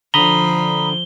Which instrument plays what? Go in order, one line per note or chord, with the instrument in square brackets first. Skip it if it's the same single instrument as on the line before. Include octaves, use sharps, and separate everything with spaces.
[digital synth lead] D3 [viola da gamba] F3 [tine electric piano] A#5 B5 D#6 [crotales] G7